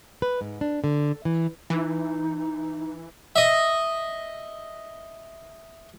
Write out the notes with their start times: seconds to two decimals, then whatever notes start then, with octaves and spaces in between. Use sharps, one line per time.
0.22 B4
0.41 G#2
0.61 D4
0.84 D3
1.25 E3
1.70 E3 D#4
3.36 D#5 E5